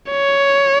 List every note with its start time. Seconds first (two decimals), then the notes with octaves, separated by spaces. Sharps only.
0.11 C#5